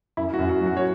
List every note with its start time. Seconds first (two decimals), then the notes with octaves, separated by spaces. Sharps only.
0.17 F#2 E4
0.34 F#4
0.39 F#2
0.49 F#4
0.61 F#3
0.66 F#4
0.77 C#5